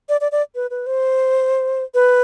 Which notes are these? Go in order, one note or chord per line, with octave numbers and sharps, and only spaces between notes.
D5
D5
D5
B4
B4
C5
B4